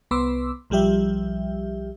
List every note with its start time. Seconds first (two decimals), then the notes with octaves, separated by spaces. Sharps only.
0.11 C2 B3 B4 C6 D6 E6
0.70 B1 F3 G3 G4 E5